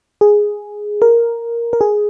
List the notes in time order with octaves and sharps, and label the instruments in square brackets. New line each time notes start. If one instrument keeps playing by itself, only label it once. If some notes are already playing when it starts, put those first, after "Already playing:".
[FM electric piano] G#4
A#4
A#4
G#4